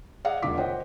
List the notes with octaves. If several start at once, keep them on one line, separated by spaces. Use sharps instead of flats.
G#4 D5 D#5 F5 F#5
E1 D2 D3 F4 D6 B6
C5 D#5 F#5 G5